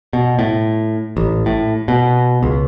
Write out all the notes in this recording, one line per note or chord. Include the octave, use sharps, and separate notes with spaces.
B2
A2
A1
A2
B2
C#2